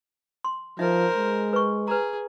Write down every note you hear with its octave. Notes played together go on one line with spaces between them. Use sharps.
C6
F3 D#4 A#4 C5 D#5 E5
G#3
B4 C#6
G#4 B4 A#5